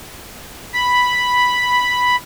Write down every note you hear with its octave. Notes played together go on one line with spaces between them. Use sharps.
B5